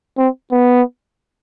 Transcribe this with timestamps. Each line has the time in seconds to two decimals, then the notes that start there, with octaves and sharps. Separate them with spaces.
0.18 C4
0.52 B3